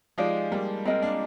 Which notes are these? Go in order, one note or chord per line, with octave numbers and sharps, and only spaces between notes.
F3 G#3 D#4 G4 D5 F5
G3 A#3
G#3 C4 A#4 D#5 A#5
A#3 D4